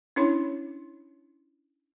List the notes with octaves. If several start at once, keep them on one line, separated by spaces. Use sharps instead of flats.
C#4 D4 E4 C#5